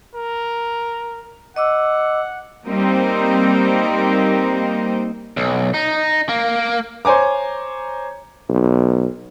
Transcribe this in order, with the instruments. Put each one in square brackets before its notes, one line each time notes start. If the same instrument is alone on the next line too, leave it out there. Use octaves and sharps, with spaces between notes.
[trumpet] A#4
[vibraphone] D#5 D6 E6 [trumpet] F#5
[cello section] G3 A#3 C4 D#4 A#4 C5
[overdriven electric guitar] B1
D#4
A#3
[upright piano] C5 C#5 G#5 A#5 D6
[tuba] B1